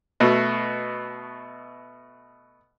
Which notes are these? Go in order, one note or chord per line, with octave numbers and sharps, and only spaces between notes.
B2 A3